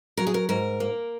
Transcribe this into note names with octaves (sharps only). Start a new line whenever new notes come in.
F#3 A#4
G#4
A#4
G#2 A#4
A#3